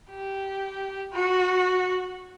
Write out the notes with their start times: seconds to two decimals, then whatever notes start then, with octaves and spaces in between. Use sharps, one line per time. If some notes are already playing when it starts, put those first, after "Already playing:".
0.10 G4
1.12 F#4